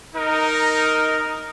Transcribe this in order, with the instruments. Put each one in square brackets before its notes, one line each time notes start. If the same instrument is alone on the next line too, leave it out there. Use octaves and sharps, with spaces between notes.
[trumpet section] D#4 A#4